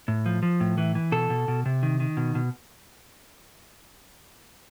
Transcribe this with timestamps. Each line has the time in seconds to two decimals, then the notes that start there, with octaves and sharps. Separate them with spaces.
0.08 A2
0.26 F3
0.43 F3
0.60 A2
0.78 E3
0.95 E3
1.12 B2 A4
1.30 B2
1.48 B2
1.66 C3
1.83 D#3
2.00 D#3
2.17 B2
2.35 B2